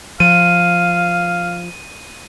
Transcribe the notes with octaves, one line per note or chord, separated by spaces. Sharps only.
F3 F5 D#7